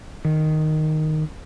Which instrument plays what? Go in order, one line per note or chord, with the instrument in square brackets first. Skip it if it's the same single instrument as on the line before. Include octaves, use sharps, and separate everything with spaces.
[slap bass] D#3